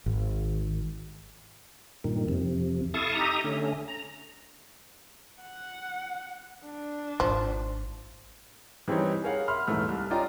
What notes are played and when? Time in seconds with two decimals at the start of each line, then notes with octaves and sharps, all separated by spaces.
0.06 G#1
2.04 G2 A#2 D#3
2.28 F2 C3
2.94 E4 A4 F5 A5 C#6 D#6
3.15 D#4 G4 E5 A#5 D#6
3.44 D3 A3 C#4
3.88 A#5
5.41 F#5
6.65 D4
7.20 G#1 F3
8.88 E3 G3 C4 C#4 D#4 C#5
9.24 G#4 A#4 C#5 F5 F#5
9.48 E5 B5 C6 F6
9.67 D#1 G#2 E3 A3 E6 F6
9.89 C2
10.10 C#4 F4 D5 D#5 G5 A#5